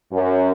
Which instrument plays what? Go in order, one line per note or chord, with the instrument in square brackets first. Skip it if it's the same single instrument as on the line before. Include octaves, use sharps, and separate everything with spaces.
[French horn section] F#2